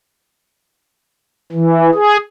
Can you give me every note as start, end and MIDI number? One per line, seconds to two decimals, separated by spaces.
1.52 1.90 52
1.95 2.17 68